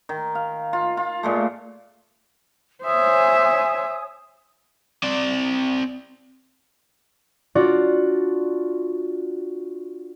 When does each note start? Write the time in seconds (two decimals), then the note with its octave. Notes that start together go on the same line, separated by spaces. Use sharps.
0.09 D#3
0.35 F5
0.73 F4
0.97 F4
1.23 A#2 G#3 A3
2.84 C5 C#5 E5 G#5 D#6
5.03 C4 D5
7.55 D4 F4 F#4 D5